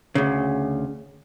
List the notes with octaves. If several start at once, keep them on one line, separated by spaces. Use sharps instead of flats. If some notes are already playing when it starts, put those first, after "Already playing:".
D2 C#3